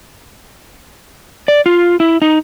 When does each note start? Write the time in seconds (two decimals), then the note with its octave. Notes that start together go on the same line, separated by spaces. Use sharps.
1.48 D5
1.66 F4
2.00 E4
2.22 D#4